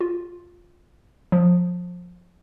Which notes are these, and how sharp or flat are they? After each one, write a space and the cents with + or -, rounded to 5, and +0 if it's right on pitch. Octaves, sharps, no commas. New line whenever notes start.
F4 +5
F3 +25